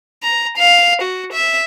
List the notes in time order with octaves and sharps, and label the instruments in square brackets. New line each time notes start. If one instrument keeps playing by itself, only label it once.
[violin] A#5
F5
F#4
E5